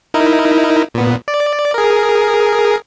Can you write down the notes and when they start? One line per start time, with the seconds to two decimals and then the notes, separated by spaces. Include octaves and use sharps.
0.14 D#4 E4 A#4
0.94 A#2 B3
1.28 D5
1.74 G#4 A#4